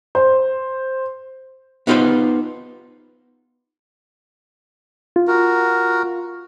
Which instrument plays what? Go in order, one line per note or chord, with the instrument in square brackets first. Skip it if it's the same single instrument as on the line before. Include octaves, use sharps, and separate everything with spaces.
[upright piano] C5
[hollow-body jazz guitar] B3 D#4 F4 G4 B4 C5
[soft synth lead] F4
[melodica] F#4 A#4